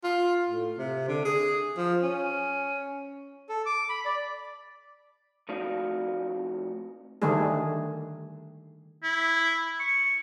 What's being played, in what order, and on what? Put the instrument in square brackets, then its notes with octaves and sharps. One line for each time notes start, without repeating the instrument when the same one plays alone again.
[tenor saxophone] F4
A2
C3
D3
G#4
F3
C#4
[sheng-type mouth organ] A4
D6
B5
D5
[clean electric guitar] F2 A3 D#4 F#4 D5 F5
[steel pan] D3 D#3 G3 A3 D4 G#4
[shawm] E4
C#6